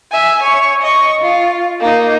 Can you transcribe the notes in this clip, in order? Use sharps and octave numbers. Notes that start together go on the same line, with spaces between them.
E5 G#5
C#5
D#5 C#6
F4
A#3 D#4